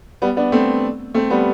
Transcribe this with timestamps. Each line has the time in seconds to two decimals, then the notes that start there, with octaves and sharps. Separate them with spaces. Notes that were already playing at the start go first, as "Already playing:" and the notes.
0.22 G3 B3
0.37 B3 D4
0.52 A3 C4
1.14 A3 C4
1.30 G3 B3